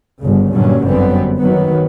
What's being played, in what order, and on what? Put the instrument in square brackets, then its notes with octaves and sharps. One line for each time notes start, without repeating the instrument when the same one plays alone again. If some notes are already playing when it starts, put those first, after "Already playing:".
[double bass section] G1 C#3
G2 A#2 D3 F#3 C#4
G1 F#2 D3 B3 C4
D#3 F#3 B3